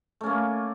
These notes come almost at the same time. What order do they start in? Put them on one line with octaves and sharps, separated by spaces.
A3 C#4 A#3